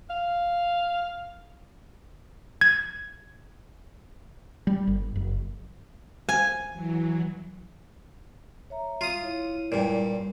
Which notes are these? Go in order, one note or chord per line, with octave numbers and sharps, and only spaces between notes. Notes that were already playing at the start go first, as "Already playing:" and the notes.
F5
G#6
G3
G1
F#1
G#5
E3 F#3
C#5 E5 A#5
F4 D#6
E4 C#5
G2 A#2